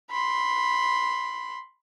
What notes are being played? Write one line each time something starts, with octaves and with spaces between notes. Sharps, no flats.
B5 C6